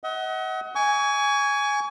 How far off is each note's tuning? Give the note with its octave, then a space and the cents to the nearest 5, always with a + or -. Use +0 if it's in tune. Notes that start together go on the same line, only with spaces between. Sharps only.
D#5 +40 F#5 +20
G#5 +0 C#6 +35